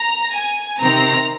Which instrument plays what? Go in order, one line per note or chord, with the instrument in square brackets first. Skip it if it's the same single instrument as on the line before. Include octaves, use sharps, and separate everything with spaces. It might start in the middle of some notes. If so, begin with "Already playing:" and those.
Already playing: [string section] A#5
G#5
C3 D#3 C4 A#5